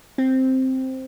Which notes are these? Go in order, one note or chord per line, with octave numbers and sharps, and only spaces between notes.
C4